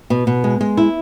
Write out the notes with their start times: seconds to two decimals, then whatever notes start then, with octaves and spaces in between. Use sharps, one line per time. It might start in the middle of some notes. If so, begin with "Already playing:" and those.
0.10 B2
0.27 B2
0.44 G#3
0.61 G#3
0.77 E4